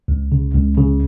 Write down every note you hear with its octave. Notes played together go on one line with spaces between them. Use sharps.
C#2
C#3
C#2
C#3